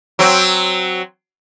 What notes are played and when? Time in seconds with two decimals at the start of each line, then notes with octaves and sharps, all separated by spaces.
0.19 F#3 C4